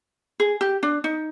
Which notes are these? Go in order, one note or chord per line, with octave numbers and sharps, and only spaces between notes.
G#4
G4
D4
D#4